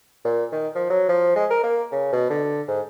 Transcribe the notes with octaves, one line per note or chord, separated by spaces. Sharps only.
A#2
D#3
F3
F#3
F3
G#3
A#4
A#3
C#3
B2
D3
G#2